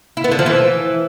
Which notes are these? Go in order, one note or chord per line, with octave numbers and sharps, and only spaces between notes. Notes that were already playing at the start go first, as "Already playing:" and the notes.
E4
B3
D3
F3
E3